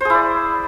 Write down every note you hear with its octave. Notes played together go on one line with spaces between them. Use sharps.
E4 G#4 C5 D5